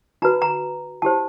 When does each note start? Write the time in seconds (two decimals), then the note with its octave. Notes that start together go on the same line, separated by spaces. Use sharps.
0.22 D#4 F#4 B4 A#5
0.42 A#5
1.02 E4 G4 C5 A5